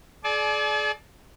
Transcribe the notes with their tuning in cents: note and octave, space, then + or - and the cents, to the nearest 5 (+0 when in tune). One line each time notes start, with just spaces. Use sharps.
G#4 +45 D5 +0 A5 -45